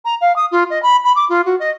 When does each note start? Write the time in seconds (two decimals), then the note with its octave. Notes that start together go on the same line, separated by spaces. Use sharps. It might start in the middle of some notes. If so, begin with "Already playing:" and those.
0.05 A#5
0.21 F5
0.36 D#6
0.51 F4
0.70 D#5
0.83 B5
1.04 B5
1.16 D6
1.29 F4
1.45 F#4
1.60 D#5